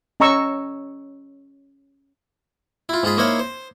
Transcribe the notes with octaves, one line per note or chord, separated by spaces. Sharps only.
C#4 D#5 A#5 C#6 E6
E4 F4
G#2 F4 G#4 B5
A#3 D#4 E4 C5 C#5 F5
C5